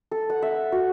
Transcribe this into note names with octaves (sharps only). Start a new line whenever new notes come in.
A4
F#5
E5
F#4